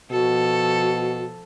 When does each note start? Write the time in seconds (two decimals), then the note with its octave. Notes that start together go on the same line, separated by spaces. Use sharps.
0.11 B2 F3 F#4 A4